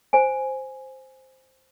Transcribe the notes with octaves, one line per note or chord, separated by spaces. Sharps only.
C5 G#5